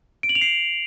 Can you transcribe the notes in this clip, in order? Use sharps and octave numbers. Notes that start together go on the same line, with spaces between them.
D7
F#7
F7
C7